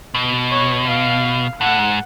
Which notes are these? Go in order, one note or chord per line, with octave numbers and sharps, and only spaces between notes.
B2
C#5
F5
A2 F#5
G#2